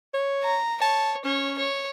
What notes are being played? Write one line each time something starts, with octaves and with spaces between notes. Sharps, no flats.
C#5
A#5
C#5 A5
C#4 C#5
C#5